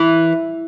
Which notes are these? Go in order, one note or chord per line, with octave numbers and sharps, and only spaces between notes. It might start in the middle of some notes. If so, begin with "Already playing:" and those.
Already playing: E3